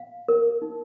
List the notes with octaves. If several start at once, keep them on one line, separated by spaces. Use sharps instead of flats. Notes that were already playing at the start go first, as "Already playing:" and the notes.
Already playing: F5
A#4
D#4